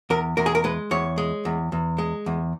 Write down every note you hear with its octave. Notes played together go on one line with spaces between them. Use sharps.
E2 A#4
E2 A#4
G#4
A#4
G#3 B4
E2 C#5
G#3
E2
E2
G#3
E2